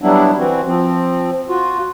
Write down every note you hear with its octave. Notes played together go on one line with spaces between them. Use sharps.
F#3 G3 B3 D4 E4
E3 C4 F#4
F3 C4
F4 F#4